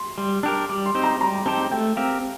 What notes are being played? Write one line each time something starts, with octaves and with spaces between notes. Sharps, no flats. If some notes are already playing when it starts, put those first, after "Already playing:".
Already playing: C6
G3 C6
D4 G4 A#4
G3 D6
C6
C4 D#4 G4 C5
A#5
G3 A#5
C4 D#4 G4 C5 A5
A3 G5
C4 G4 A#4 F5